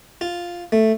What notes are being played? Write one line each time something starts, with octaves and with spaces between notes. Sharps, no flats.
F4
A3